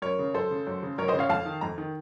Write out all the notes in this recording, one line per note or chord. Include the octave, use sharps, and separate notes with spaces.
F#2 A#4 C#5
C#3
F#2 A4 C5
C#3
F#2
C#3
F#2 A#4 C#5
C5 D#5
C#3
C#5 F5
F2 F5 A5
D#3
F2 A#5
D#3